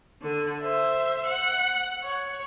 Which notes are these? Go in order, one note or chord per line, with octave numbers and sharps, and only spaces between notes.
D3
C5 E5
F#5
C#5